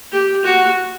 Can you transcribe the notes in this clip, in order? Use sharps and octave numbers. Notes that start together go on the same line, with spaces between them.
G4
F#4